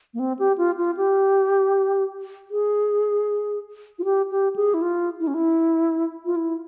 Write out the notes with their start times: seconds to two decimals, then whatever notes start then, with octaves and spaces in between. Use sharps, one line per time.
0.14 A#3
0.19 C4
0.39 G4
0.58 F4
0.78 F4
0.97 G4
2.51 G#4
3.99 F4
4.04 G4
4.31 G4
4.56 G#4
4.74 E4
4.82 F4
5.20 E4
5.27 C#4
5.34 E4
6.25 F4
6.36 E4